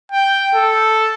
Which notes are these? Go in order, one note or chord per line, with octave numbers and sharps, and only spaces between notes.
G5
A4